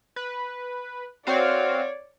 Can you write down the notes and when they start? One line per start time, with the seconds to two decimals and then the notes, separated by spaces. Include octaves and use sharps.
0.16 B4
1.27 C4 F#4 C#5 D5 F5